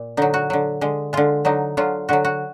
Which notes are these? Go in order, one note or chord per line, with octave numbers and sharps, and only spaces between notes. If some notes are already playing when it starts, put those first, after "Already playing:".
Already playing: A#2
D3 F#3 D#4
F#4
D3 F#3
D3 G#3
D3 G#3 F4
D3 F#3 D#4
D3 F#3 F4
D3 F#3 F#4
F#4